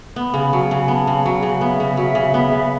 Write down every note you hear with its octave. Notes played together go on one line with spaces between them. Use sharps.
B3 B5
C#3
F#3 G#5 A5
C#3
B3 A5 B5
C#3
F#3 F#5 G#5
C#3
B3 E5
C#3
F#3 E5
C#3
B3 E5
C#3